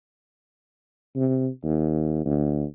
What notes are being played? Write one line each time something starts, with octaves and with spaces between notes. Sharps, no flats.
C3
D#2
D2